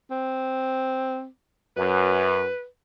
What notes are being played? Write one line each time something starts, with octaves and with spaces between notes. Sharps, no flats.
C4
F#2 B4